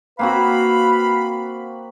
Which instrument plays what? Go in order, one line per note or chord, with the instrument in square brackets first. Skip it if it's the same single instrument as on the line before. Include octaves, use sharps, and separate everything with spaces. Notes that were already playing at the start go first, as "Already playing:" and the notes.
[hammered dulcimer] A#3 C4 F#4 [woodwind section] B4 F5 B5